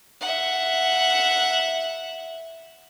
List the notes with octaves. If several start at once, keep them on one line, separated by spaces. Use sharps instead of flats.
E5 F#5